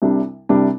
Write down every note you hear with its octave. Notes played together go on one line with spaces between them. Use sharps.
C2 C3 G3 D4
C2 C3 G3 D4